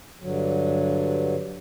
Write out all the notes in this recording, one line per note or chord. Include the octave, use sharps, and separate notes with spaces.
G2 D3 F#3